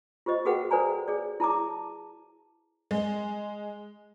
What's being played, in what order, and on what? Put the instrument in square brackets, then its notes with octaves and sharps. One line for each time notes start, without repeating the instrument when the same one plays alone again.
[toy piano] F4 G4 C5 D#5
F#4 G#4 A#4 B4 F#5 G5
A4 B4 C5 D5 G#5 A#5
G#4 D5
E4 A5 A#5 D6
[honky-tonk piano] G#3